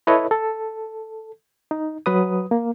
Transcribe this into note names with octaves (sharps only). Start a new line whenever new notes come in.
E4 A4 B4 C#5 D#5
A4
D#4
F#3 B4 D#6
A#3